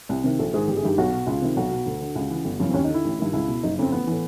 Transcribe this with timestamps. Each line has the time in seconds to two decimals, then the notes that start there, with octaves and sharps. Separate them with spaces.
0.09 C2
0.24 C3 D#3
0.39 A#1 A4
0.54 G#2 D#3 G#4
0.68 G1 G4
0.77 G#4
0.83 G2 D#3 G4
0.98 B1 F#4
1.12 B2
1.26 C#2 F4
1.42 C3 D#3
1.56 B1 F#4
1.71 B2
1.86 D2
2.01 D3
2.15 C#2
2.30 C#3 E3
2.45 G1
2.60 F#2 C#3 E3
2.69 C4
2.74 D#2 C#4
2.84 D#4
2.89 D3
2.94 E4
3.05 A1
3.19 G2 D#3
3.33 C#2 E4
3.48 B2
3.63 F#1 D#4
3.78 F2 C#3 C4
3.92 A1 B3
4.07 A2 E3